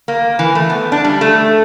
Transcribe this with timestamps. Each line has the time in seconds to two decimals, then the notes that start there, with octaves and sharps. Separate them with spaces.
0.08 A#3
0.39 E3
0.55 A3
0.70 B3
0.92 D4
1.04 G3
1.21 A3